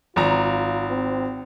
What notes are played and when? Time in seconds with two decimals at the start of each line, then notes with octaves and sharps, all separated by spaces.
0.16 G#1 F4 A#5
0.90 C4